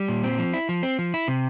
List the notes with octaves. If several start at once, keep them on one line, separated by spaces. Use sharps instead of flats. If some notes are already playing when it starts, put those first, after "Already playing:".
Already playing: G3
A#2
C4
F3
E4
F3
C4
F3
E4
C3